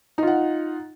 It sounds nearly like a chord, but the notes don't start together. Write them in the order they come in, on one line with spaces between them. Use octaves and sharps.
D#4 F4 F#5